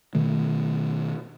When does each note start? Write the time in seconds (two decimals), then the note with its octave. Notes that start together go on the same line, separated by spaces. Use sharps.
0.15 B2 D#3 A3